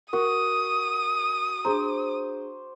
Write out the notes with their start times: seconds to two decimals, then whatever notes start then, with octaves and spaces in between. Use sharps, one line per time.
0.13 F#4 A#4 C#6 D#6
1.65 D4 G#4 C5 A#5 D6